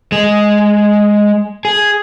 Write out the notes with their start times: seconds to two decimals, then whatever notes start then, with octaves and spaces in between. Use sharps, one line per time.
0.12 G#3
1.65 G#4